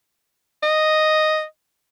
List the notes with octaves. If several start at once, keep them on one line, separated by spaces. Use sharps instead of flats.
D#5